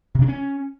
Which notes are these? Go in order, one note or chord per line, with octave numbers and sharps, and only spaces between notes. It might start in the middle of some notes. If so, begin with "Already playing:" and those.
C3
D4
C#4